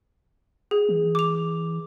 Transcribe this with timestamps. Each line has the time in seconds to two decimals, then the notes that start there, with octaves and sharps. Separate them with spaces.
0.71 G#4
0.89 E3
1.15 D6 F7